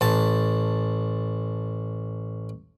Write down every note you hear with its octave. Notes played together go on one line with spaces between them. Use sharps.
A1 A5